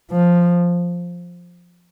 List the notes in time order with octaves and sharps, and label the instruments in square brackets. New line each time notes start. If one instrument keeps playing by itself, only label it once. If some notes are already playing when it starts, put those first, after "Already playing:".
[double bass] F3